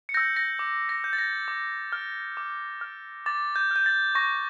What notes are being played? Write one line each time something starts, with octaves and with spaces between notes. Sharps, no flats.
C#7
E6 G6 A#6
A#6
D6
A#6
G6
A6
A#6
D6
F6
D6
F6
D6 A6
G6
F6 G6
A6
C#6 A#6